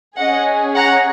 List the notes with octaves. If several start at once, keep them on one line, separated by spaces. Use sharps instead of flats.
C#4 G#4 D#5 F#5
F#5 A#5